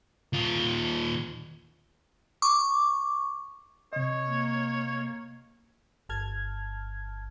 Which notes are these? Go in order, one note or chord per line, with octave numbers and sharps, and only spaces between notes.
D#2 F4
C#6 D6
C3 C#5 D#5
A#3
G1 A5 F6 G#6